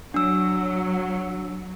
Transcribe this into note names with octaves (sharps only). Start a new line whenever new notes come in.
F#3 D4 E6